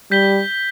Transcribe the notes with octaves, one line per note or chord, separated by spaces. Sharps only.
G3 G6 B6 G7